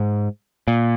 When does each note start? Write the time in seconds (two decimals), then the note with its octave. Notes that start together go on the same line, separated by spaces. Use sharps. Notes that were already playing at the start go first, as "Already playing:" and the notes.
Already playing: G#2
0.68 A#2